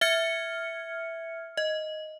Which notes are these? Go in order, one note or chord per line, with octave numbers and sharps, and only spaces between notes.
E5 F6 G#6 C#7
D#5